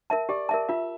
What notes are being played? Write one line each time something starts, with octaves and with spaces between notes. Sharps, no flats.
A#4 E5 A5
G4 D5
A#4 E5 A5
F4 E5